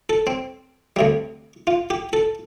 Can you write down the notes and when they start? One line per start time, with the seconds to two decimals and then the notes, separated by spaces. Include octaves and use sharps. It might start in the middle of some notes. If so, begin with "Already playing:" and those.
0.09 A4
0.27 C4
0.96 D2 C3 G3
1.67 F4
1.90 G4
2.13 A4